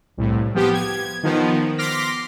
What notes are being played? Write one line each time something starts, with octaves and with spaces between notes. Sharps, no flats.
C2 A2
F3 B3 G4
G#6
D#3 F3 B3
C6 D6 F6 A#6 B6